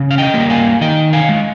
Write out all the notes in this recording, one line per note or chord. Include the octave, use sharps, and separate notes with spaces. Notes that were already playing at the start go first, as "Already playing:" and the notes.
Already playing: C#3
F5
D#5 G5
G3 A#3
F5 G#5
D#3 D#5 G5
F5 G#5
G#3